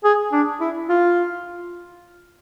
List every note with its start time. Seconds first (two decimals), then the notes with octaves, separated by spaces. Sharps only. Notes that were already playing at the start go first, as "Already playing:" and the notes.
0.04 G#4
0.32 D4
0.61 E4
0.90 F4